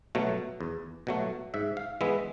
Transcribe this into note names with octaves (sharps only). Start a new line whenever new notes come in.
B2 F#3 A3
E2
B2 F#3 A3
G#2 E5
F5
E3 G#3 B3 E5